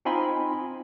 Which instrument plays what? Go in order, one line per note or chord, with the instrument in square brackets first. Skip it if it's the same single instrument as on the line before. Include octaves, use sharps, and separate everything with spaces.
[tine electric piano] C4 D#4 F4 G#5 B5 C6